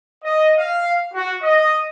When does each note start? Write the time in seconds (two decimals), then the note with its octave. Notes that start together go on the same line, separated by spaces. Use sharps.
0.23 D#5
0.56 F5
1.13 F#4
1.41 D#5